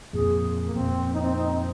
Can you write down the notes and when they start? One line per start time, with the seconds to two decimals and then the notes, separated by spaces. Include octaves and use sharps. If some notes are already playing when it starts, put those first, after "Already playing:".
0.13 F2 A#2 G#4
0.65 A#3
0.75 F2 A#2 C4
1.05 C4
1.13 D#4
1.22 C4
1.36 D#4
1.51 C4